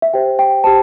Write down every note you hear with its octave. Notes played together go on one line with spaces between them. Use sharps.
E5
G4 C5 G5
G5
G4 C5 A5